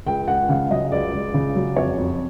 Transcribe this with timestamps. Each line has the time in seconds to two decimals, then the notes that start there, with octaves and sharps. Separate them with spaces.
0.07 C#2 G5
0.27 C#2 F#5
0.49 C#3 F5
0.71 F#3 D#5
0.92 C#2 D5
1.13 C#2
1.34 C#3
1.56 F#3
1.77 F2 C#5
1.98 F2